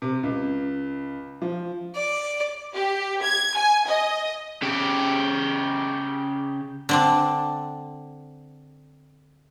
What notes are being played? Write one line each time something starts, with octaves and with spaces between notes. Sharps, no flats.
C3
C#2
F3
D5
G4
G#6
G#5
D#5
C#3 G4
D3 C4 D4